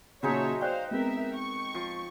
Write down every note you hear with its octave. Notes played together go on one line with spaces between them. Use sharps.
A#2 C#3 F#3 G#3 D#4 C#5 E5 A5
C5 D5 F5 G5 F#6
G#3 B3 C4 A#4 E5
C#6
F3